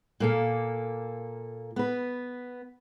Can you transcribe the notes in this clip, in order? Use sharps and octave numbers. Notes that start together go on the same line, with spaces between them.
A#2 A#3 A4
B3 B4